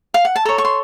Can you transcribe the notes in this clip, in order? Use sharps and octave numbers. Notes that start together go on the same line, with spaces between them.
F5
F#5
A5
A4 C#5 A#5
C#6
C6